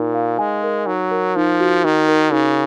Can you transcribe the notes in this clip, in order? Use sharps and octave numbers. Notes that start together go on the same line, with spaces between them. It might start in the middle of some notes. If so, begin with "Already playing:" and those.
Already playing: A#2 D#4 A#4
F5
G#3 G#5
A#4
F#3 D#4
A#4
F3 D#4
F#4
D#3 D#4
A#4
C#3 D#4